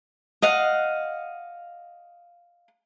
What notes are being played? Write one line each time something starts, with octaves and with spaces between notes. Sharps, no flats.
D#5 F5 F#5